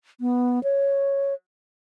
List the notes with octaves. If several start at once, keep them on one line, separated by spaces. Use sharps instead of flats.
B3
C#5